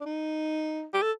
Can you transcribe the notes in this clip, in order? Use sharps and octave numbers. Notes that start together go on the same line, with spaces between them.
D4
D#4
G4
A4